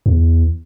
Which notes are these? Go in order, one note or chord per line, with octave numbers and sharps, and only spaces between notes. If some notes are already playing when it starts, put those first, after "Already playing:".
E2